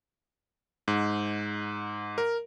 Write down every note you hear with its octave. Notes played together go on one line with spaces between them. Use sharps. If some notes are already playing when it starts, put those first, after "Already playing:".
G#2
A#4